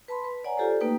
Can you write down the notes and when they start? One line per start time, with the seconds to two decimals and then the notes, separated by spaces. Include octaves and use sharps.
0.08 B4 A5 B5 C6
0.24 B4
0.44 C#5 D5 F#5 G#5 A#5
0.57 F4 G4 A4 C5 D5
0.80 A3 A#3 D#4 G4 B4 G5